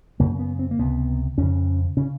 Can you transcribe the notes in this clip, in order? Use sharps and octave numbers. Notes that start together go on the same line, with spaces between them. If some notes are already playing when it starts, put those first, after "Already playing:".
F#2 C#3 A#3
B3
C4
A#3
C#2 C3 B3
F2 C#3 C#4
C#3 C#4